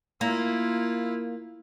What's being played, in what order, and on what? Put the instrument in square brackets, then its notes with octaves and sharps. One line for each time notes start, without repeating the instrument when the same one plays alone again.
[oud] A#3 [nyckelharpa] E4 F4